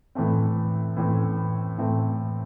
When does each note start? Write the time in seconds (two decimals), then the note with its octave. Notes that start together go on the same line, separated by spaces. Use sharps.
0.15 A2 E3 A3 C4
0.97 A2 E3 A3 C4
1.78 A2 E3 A3 C4